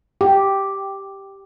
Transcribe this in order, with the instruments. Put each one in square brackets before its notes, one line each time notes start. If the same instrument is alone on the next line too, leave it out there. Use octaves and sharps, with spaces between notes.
[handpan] G4